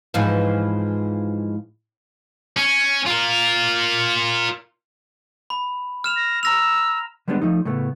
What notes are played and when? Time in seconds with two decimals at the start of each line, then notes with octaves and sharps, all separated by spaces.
0.14 G#2 E3 F3
2.57 C#4
3.07 F4 A#4
5.50 B5
6.04 F6 E7 F7
6.16 A#6
6.43 A#5 E6 A#6 F7
7.28 D3 G3 G#3 B3 D4
7.41 F3 A3 D#4
7.65 A2 C#3 A3 B3